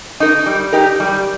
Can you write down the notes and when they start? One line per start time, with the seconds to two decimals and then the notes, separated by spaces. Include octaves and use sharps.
0.20 D#4 A#4
0.46 G3
0.72 D#4 G4 A#4
1.00 G3